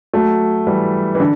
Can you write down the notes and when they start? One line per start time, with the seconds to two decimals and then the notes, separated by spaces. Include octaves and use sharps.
0.13 F#3 A3
0.67 E3 G3
1.15 E3
1.19 D3